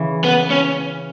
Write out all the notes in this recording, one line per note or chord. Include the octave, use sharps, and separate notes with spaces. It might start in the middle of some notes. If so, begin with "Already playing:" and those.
Already playing: C#3 E3
B3
C#4